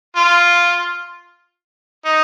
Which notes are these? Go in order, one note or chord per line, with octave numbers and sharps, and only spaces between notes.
F4
D#4